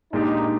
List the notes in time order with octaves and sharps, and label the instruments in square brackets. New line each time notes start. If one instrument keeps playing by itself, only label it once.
[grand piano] A#2 G#3 D4 G4 [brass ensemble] D#4